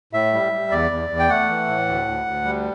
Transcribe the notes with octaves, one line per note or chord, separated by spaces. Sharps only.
A2 E5
G3
G3
E2 D5
E2
E2
G5
A3 F#5
E3
A2
D2
D2
D2
G3